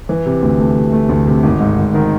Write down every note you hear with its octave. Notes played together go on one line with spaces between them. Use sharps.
E3
C3
D2
A3
C3
A3
D2
C3
G#1
G#2
G#1
D#3